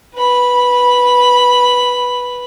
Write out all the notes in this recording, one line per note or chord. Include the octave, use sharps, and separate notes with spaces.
B4 B5